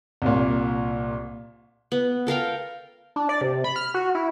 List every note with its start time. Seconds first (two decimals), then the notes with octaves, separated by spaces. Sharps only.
0.22 C2 A#2
1.92 B3
2.27 A4 A#4 F5 G5
3.16 D4
3.29 D5
3.41 C3
3.64 B5
3.76 F6
3.94 F#4
4.15 E4